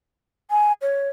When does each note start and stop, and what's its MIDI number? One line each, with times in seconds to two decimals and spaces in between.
0.51 0.73 80
0.82 1.09 73